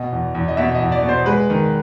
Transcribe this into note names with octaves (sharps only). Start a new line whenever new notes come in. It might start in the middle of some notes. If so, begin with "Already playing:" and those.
Already playing: B2 D#5
E2
E2
D#5
B2 E5
D#5
E2
D5
B2
C5
G#3 B4
D#3